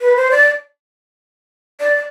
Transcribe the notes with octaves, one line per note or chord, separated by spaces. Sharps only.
B4
C5
D5
D5